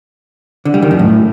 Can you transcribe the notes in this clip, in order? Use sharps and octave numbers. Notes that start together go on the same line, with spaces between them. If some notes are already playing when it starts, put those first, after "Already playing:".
D3
G3
D#3
F#2
A2